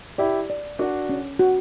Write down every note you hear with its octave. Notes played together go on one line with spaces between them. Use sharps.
E4 G4 D5
D5
D4 F#4 A#4
C#4
F#4